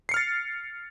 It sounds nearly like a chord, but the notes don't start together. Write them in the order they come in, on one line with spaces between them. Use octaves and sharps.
C7 C#7 F6 A6